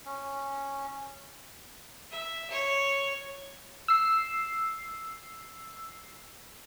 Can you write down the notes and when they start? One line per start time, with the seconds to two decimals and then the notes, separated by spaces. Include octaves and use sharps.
0.05 C#4
2.11 E5
2.50 C#5
3.88 E6 C7